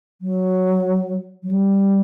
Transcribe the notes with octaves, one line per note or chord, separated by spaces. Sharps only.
F#3
F#3
G3